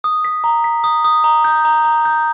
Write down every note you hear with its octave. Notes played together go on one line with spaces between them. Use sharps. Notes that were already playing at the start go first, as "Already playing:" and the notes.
D#6
B6
A#5
B6
D#6
D#6
A#5
G6
A#5
A#5
G6